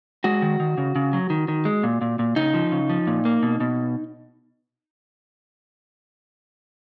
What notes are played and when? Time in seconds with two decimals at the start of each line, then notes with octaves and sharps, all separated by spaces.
0.24 G#3 F#4
0.42 D#3
0.60 D#3
0.78 C#3
0.96 C#3
1.13 F#3
1.30 D#3
1.48 D#3
1.65 G#3
1.83 A#2
2.01 A#2
2.19 A#2
2.36 C#3 D#4
2.54 F3
2.72 C#3
2.89 F3
3.07 A#2
3.25 A#3
3.43 B2
3.60 B2